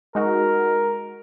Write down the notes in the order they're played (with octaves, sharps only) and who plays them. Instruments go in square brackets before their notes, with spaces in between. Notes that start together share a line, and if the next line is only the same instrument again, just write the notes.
[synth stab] G#3 D#4 F#4 [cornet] A#4